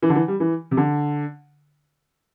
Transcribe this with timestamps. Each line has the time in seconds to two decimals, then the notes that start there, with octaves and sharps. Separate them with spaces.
0.02 E3
0.10 D3
0.15 E3
0.28 G3
0.40 E3
0.71 C3
0.77 D3